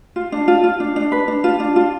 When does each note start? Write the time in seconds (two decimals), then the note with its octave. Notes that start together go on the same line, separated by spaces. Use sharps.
0.16 F4
0.32 D4
0.48 F4
0.64 F4
0.80 D4
0.96 D4
1.12 B4
1.28 D4
1.44 F4
1.60 D4
1.76 F4